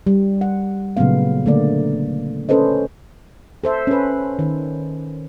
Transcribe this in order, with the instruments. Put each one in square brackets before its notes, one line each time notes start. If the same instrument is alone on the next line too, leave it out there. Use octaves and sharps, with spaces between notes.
[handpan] G3
F#5
A#2 C#3 F#3 A3 B3 F5
D3 A3 A#3 D5
C#4 A4 B4 C5 D#5
A4 C5 E5
C#4 B4
D#3